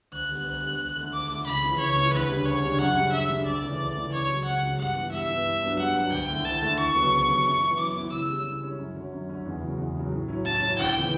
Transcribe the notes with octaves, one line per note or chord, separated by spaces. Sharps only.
D2 F#6
D3 G3 B3
D2
D3 G3 B3
D2
D3 A3
D2 D6
D3 A3
C#2 B5
C#3 E3
C#2 C#5
C#3 E3
D2 B4
C#3 G3 D4
D2 C#5
C#3 G3 D4
F#2 F#5
C#3 G3 D4
F#2 E5
C#3 G3 D4
D2 D5
C#3 E3 A3
D2
C#3 E3 A3
C#2 C#5
C#3 F#3
C#2 F#5
C#3 F#3
G2 F#5
E3 B3
G2 E5
E3 B3
G2
F#3 B3 D4
G2 F#5
F#3 B3 D4
D2 G5
D3 A3 E4
D2 A5
D3 A3 E4
D2 C#6
C#3 F#3 B3
D2
C#3 F#3 B3
F#2
E3 B3 E4
F#2 D6
E3 B3 E4
C#3 E6
G3 C#4 E4
C#3
G3 C#4 E4
F#2
D3 F#3 C#4
F#2
D3 F#3 C#4
E2
C#3 F#3
E2
C#3 F#3
A2
F#3 C#4 E4
A2 A5
F#3 C#4 E4
D2 G5
C#3 E3 B3 E4